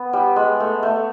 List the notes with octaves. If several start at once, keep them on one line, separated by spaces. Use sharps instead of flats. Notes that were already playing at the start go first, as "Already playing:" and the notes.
Already playing: B3
G3
G#3
A3
A3